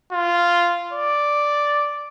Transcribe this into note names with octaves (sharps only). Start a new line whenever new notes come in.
F4
D5